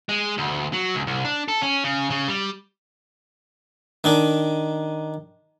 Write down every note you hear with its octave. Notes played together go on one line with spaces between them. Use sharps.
G#3
D2
F#3
C#2
C2
D4
A4
C#4
C#3
C#3
G3
D#3 D4 D#4